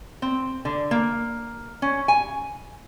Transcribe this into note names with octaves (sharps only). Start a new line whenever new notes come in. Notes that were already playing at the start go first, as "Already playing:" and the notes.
C4
D3
A#3
C#4
G#5